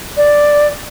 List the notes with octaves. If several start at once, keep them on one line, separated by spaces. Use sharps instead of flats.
D5